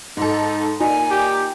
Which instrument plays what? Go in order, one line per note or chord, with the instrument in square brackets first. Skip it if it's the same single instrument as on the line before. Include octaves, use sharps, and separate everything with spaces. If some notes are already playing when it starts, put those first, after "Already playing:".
[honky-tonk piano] G#2 A4 [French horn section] D#4
[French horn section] A#2 [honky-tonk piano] D#4 [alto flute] G#5
[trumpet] G4